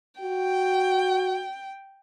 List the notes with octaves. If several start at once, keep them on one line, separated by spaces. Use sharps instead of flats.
F#4 G5